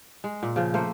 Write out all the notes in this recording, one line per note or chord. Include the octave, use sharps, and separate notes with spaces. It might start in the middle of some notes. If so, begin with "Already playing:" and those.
G#3
A#2
C#3 F3
A3 A#3 C5